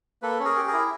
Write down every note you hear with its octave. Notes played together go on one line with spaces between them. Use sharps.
A#3 A4 B4
C#4
G#4 A#4
G4
G#4 A#4
E4